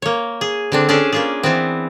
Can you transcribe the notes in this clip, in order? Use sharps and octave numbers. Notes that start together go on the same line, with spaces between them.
A#3 C#5
G#4
D3 C4 D4
C#4 D4 G#4 A4
A#3 F4 G#4
E3 B3 C4